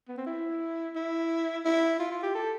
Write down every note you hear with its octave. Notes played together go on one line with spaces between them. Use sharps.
B3
C4
E4
E4
E4
F4
F4
G4
A4